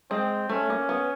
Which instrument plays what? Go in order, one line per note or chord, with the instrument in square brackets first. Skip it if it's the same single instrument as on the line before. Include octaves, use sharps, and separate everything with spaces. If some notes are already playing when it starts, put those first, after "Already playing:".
[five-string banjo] G#3 [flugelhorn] C4
[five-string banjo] A3 [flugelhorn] C#4
[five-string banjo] A#3
B3